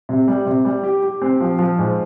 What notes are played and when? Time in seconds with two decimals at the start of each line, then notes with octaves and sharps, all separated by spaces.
0.09 C3
0.28 G3
0.46 C3
0.65 G3
0.84 G4
1.03 G4
1.22 C4
1.40 F3
1.59 F3
1.78 G#2